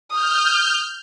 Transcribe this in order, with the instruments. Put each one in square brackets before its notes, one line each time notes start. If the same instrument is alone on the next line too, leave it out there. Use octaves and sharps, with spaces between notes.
[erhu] D#6 [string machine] F6 G6